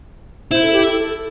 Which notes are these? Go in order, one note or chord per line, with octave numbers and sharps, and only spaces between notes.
E4 C5
A4
G4
A4
A4